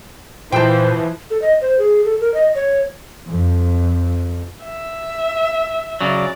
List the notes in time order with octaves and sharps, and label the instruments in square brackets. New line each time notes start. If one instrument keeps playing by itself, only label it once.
[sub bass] A#2 [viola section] E3 F3 [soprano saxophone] C5 [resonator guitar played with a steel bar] G5 A5
[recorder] A4
D#5
C5
G#4
A4
A#4
D#5
C#5
[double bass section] F2
[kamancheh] E5
[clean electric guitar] C#3 F#3 [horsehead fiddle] D5